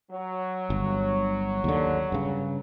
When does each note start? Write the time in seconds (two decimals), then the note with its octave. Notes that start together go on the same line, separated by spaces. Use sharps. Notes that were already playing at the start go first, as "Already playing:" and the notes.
0.10 F#3
0.70 G1
1.64 D#2 D3
2.12 G2 C#3